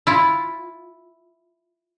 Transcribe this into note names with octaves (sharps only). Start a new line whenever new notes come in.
E4 F4